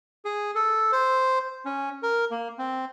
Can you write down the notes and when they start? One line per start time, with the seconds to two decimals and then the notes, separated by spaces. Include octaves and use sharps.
0.25 G#4
0.55 A4
0.92 C5
1.65 C#4
2.03 A#4
2.31 A#3
2.58 C4